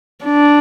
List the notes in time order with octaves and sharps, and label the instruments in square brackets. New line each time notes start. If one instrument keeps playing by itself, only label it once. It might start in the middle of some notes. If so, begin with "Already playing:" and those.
[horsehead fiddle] D4